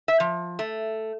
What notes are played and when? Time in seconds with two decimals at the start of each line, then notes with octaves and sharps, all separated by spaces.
0.08 E5
0.20 F3
0.59 A3